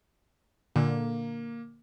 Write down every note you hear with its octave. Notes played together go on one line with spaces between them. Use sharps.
A#2 D3 A#3